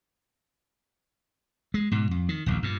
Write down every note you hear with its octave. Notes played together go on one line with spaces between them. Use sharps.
G#3
G#2 B2
F2
D#3
D#1 A#1 D#2
G2 A#2